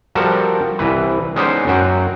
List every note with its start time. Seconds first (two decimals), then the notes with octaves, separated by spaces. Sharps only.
0.15 F3 G3 F#4 A4 A#4 A5
0.79 C2 E3 B4
1.36 G#3 B3 C#4 D#4 C5 D5
1.67 F#2 F#3 F#4 G5